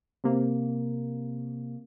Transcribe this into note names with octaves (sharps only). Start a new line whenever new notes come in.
C3 A#3